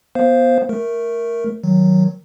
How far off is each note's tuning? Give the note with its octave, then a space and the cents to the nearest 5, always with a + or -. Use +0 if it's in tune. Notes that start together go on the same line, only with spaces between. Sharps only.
B3 -15 C5 +0 F5 -10
A3 +0 A#4 +0
D#3 +0 F#3 +0